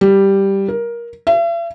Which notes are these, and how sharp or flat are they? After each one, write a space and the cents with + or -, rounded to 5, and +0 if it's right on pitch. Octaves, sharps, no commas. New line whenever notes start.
G3 +0
A#4 +15
E5 +45